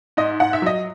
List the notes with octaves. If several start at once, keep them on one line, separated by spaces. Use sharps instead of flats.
G#2 D#5
G#2 F#5
E5
F#3 D#5